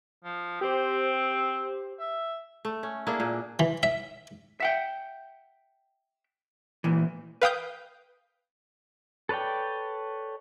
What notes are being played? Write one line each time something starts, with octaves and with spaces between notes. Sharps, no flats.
F3
C4 G4 C5
E5
A3
C#4
A#3 D4 E4 G#4
A#2
E3
E5
E5 F#5 G5
A#2 E3
B4 F5 G5 D#6 G6
A4 B4 C#5 D5 G5